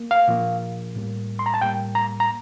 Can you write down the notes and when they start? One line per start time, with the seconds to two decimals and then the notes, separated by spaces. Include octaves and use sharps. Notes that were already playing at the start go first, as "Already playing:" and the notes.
Already playing: A#3
0.11 F5
0.28 A#2 F3 A#3
0.96 A2 G3 A#3
1.39 C6
1.46 A#5
1.54 A5
1.62 A2 G3 A#3 G5
1.95 A#5
2.20 A#5